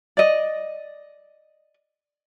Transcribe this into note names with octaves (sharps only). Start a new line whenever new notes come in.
D5 D#5